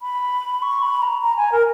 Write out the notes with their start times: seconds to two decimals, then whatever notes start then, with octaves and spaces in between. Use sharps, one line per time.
0.02 B5
0.62 C#6
0.83 B5
1.02 A#5
1.22 A#5
1.37 G#5
1.52 A#4